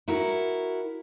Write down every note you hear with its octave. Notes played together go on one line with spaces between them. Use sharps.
E4 F#4 A#4